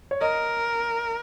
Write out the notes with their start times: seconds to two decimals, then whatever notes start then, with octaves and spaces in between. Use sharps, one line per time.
0.11 C#5
0.20 A#4 D#5